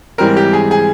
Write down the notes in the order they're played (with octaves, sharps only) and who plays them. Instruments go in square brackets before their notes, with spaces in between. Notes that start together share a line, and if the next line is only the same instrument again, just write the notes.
[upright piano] G#2 E3 G3 C4 A#4
G4
G#4
G#4